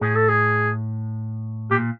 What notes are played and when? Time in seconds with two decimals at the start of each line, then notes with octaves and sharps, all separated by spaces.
0.01 A2 G#4
0.15 A4
0.29 G#4
1.71 A#2 G4